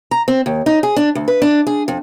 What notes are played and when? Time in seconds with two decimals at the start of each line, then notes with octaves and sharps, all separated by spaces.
0.11 A#5
0.28 C4
0.46 D#2
0.66 D#4
0.83 G#4
0.96 D4
1.15 D2
1.28 B4
1.42 D4
1.67 G#4
1.88 F2